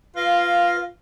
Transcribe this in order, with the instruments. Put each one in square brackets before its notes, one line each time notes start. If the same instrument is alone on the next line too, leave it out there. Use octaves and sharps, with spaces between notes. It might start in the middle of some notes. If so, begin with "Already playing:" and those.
[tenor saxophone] F4 [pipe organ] B4 F5 A#6